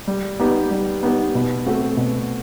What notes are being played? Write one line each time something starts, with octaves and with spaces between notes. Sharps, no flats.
G3
B3 D#4 G4 B4
G3
B3 D#4 G4 B4
B2
A3 C4 F#4 A4
B2